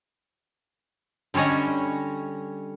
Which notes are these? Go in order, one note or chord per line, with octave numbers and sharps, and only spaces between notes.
D3 G3 C#4 C#5 D#5